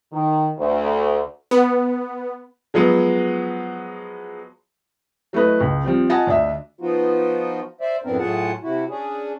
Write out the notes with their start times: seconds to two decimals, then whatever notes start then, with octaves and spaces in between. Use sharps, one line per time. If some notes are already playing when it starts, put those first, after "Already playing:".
0.13 D#3
0.58 D2
1.51 B3
2.74 F3 F#3 G#3 B3
5.33 F#3 A3 E4 B4 D#5
5.61 C#2
5.84 F3 G3 C4
6.09 F4 D#5 F#5 G#5 A5
6.27 D2 D4 D#5 E5
6.81 F3 B3 D#4 F4 F#4
7.81 C5 D5 E5
8.04 F#2 A2 B3 C4 D4 A#4
8.18 A2 F#3 F4 G#4 F#5 A5
8.62 C3 E4 F#4
8.89 C#4 D4 G#4